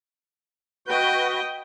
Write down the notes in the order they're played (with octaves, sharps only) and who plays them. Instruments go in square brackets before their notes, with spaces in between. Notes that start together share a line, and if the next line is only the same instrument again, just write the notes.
[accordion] F#4 B4 [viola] D#5 G5